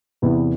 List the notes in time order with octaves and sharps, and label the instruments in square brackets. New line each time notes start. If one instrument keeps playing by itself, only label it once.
[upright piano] E2 C3 E3 B3